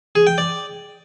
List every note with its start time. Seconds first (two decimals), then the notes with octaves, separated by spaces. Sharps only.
0.15 G#4
0.27 G5
0.38 D5